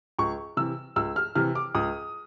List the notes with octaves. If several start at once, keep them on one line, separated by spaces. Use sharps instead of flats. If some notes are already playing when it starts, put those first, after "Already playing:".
C#2 C#6
C3 E3 E6
C#2 E6
F6
C3 E3 F6
D6
C#2 D#6